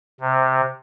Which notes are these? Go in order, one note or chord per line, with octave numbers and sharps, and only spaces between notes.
C3